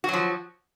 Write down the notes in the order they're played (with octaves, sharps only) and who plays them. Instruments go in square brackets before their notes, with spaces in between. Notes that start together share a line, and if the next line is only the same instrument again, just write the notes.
[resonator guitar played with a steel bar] F#4
F#3
F3